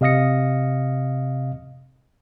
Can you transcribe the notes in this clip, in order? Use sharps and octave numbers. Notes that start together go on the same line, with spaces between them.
C3 D#5 F5 D#6 A#6 C#7